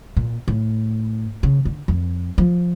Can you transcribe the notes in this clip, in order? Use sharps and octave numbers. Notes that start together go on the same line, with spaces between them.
A#2
A2
C#3
D3
F2
F3